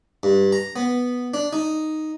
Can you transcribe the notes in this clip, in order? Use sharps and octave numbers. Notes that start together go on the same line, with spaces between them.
G2
A#5
B3
D4
D#4